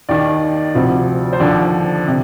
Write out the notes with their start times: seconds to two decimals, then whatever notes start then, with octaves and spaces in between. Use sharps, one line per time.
0.09 D#2 D#3 D5
0.75 D2 C3 F3
1.33 C5
1.40 D#2 D3 F3 D5
2.08 C3